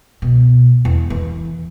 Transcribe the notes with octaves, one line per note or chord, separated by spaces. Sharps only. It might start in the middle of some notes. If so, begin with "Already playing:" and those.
B2
E2
E3